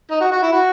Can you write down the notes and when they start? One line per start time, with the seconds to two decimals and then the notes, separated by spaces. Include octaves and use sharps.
0.11 D#4
0.21 F#4
0.32 F#4
0.42 E4
0.53 F#4